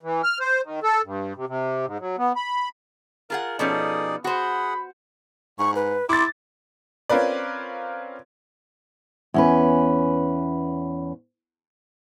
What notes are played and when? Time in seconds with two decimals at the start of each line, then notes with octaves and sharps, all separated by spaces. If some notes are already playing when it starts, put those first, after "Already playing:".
0.03 E3
0.24 F6
0.40 C5
0.65 D#3
0.83 A4
1.05 G2
1.36 C3
1.48 C3
1.86 G#2
2.00 F#3
2.18 B3
2.36 B5
3.30 F4 G#4 A#4 F#5
3.59 B2 F3 C#4 D#4 G#4 A4 D5
4.24 F#4 G#4 C5 F#5 B5
5.59 G#2 C#6
5.76 B4
6.09 E4 C6 D6 A6
7.09 C4 C#4 F4 A#4 B4 D5
9.34 E2 C#4 B4